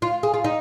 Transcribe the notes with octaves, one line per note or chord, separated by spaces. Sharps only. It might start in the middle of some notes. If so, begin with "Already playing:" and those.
F4
G#4
F4
D#4